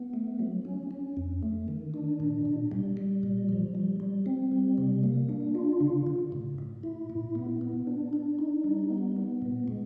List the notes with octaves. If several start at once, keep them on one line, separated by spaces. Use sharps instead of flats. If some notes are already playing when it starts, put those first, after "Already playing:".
Already playing: B3
A3
F#3
C#4
C#4
F2
A3
D#3
D4
A#2
A#2
G3
G3
A#2
F3
G3
G3
C4
G3
C3
A#3
D4
F4
C#3
C#3
A2
A2
E4
A#2
B3
B3
D4
D4
D#4
G3
B3
B3
A#2
G#3